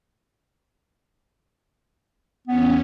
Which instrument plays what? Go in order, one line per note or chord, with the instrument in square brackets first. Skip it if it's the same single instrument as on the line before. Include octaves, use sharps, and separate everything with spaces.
[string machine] E2 C#4 [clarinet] B3